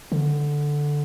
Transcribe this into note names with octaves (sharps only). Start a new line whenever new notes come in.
D3